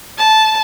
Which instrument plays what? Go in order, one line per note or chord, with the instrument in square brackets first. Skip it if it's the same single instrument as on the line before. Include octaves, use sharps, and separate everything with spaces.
[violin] A5